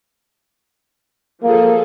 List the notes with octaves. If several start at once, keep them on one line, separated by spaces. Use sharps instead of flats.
F3 A#3 G#4 A4